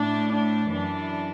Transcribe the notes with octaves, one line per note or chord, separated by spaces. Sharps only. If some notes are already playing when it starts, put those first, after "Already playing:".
Already playing: A2 A3 D4
D4
F#2 E3 D4